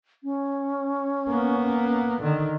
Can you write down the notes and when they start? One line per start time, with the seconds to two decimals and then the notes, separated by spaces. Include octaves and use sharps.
0.23 C#4
1.29 A#3 B3
2.22 D3 D#3